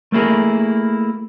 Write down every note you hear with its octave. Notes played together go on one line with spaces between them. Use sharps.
A3 A#3 E4 G#4 A#4